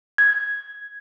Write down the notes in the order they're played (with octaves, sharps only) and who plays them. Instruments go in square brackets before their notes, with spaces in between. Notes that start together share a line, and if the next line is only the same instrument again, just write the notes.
[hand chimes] G#6